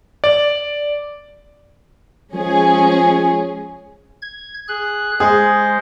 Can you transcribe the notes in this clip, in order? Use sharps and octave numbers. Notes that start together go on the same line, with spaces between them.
D5
F3 G#3 C#4 G#4
G#6
G#4 F#6
G#3 G#4 C5